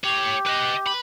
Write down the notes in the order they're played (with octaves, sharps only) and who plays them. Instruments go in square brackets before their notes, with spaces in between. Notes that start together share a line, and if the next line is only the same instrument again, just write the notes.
[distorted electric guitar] A2 C#5 [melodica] G4
[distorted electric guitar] B4 D#5
B4 B5